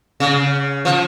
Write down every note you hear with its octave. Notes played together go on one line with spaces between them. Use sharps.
C#3
F3